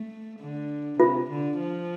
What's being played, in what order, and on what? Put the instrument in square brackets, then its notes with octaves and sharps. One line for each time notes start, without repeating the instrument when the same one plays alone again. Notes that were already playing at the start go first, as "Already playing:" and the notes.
Already playing: [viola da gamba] A3
D3
[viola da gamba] C3 [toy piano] F4
[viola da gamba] D3
F3